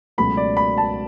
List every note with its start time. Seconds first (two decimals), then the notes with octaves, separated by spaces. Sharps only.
0.18 C#2 B2 F#3 A3 B5
0.37 D5
0.57 B5
0.78 A5